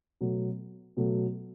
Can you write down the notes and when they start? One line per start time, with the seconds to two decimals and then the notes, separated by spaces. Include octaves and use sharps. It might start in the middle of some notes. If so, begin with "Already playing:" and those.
0.21 B2 F#3 A3
0.97 B2 F#3 A3